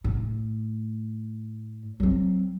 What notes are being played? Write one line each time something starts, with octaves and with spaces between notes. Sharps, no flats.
A2
F#3 C4